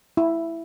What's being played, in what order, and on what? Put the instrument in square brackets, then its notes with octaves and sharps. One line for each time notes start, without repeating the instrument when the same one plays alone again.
[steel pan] E4